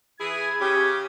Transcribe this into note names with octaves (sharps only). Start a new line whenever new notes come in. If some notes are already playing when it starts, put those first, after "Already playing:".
E3 E4 G#4 G#6
C#3 C#4 G4